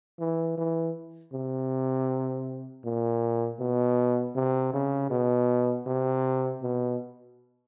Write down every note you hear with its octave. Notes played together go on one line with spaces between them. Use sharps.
E3
E3
C3
A#2
B2
C3
C#3
B2
C3
B2